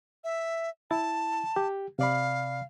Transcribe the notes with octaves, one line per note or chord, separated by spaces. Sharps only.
E5
E4 A5 A6
G4
C3 D5 F5 B5